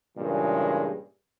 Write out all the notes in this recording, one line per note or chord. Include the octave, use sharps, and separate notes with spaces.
G2 A#2 C#3 E3 G#3